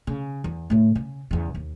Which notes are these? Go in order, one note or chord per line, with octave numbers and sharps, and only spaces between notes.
C#3
E2
A2 D3
C#3
E2 C#3
D#2